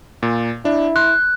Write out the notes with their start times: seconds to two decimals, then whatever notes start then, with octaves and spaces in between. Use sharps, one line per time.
0.23 A#2
0.65 D4 E4
0.96 C6 F#6